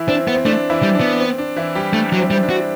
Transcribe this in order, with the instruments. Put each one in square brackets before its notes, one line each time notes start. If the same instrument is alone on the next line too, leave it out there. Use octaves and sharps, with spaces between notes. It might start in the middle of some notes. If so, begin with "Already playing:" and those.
Already playing: [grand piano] E3 E4
[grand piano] C4 [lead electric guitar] D4
[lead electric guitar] B3
[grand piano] C4
[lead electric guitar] A3 [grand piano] D4
[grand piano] E3 E4
[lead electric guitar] G3
[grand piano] D4
[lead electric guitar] B3
[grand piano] C4
D4
E3 E4
G3 G4
[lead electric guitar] A3 [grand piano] D4
[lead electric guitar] F#3
[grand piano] C4
[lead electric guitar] G3
[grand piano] C4
D4
[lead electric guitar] F#4